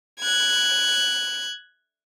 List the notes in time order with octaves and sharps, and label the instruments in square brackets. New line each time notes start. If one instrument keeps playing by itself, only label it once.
[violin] F#6 G#6